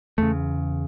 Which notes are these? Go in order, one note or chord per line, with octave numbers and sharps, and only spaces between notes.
E2 C#3 A3